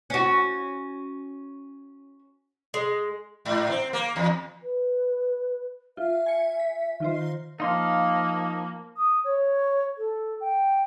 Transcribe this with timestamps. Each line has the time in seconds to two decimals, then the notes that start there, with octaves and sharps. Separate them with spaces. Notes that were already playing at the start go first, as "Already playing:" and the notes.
0.10 C#4 F#4
2.74 G#3
3.45 G#2
3.70 C4
3.93 A#3
4.16 E2
4.62 B4
5.97 F4 E5
6.26 G#5 C#7
6.60 B6
7.00 D#3 F4 C5
7.60 F3 A#3 D#4 F5 C6 F6
8.96 D#6
9.24 C#5
9.97 A4
10.40 G5